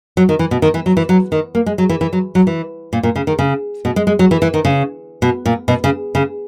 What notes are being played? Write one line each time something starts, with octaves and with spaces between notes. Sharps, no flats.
F#3
D#3
E3
B2
D#3
E3
F#3
E3
F#3
D#3
A#3
G#3
F#3
E3
E3
F#3
F#3
E3
A#2
A#2
C#3
D#3
C#3
B2
G#3
G#3
F#3
E3
E3
D#3
C#3
B2
A#2
B2
C#3
C#3